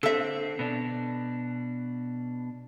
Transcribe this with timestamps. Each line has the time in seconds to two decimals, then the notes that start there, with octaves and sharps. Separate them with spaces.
0.03 D3 C4 A4 E5
0.59 B2 D4